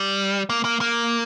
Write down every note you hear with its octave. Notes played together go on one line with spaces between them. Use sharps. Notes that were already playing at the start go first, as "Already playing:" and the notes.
Already playing: G3
A#3
A#3
A#3